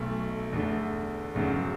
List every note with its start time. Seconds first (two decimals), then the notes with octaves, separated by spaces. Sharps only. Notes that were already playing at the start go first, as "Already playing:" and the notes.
Already playing: B1 B2 A3
0.53 E2 D3 A3
1.34 E1 E2 C#3 F#3